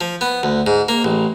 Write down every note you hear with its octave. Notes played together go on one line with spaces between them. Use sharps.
F3
B3
D2
G#2
A#3
A1